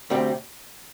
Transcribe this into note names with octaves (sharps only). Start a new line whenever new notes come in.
D2 C3 G3 C4